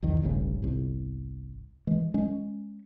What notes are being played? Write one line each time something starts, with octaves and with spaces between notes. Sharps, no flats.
B1 E2 D#3
F1 B1 G2 C#3
G1 C2
E3 G#3
G#3 C#4